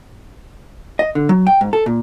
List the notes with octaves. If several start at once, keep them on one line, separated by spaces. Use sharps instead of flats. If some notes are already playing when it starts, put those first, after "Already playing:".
D#5
D3
F#3
G5
G#2
A4
A#2